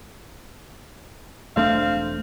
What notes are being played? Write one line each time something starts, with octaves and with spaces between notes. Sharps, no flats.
E1 A3 C4 D4 F5